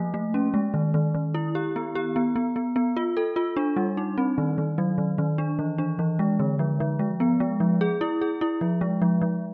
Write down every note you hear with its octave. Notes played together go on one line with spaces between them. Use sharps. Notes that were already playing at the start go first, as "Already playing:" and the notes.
Already playing: F3 A3 A#3
A3
C#4
G#3
D#3
D#3
D#3
E4
G4
B3
G4
B3
B3
B3
B3
F4
A4
F4
D4
G3
D#4
C4
D#3
D#3
F#3
D#3
D#3
D4
E3
D4
E3
G#3
D3
F3
F3
G#3
B3
G#3
F3
G#4
E4
G#4
E4
F3
G#3
F3
F3